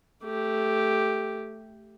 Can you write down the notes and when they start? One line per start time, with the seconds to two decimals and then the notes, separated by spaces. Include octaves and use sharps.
0.24 A3 G4